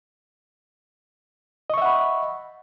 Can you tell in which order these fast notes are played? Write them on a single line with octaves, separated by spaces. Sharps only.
D#5 C#6 E5 F#5 B5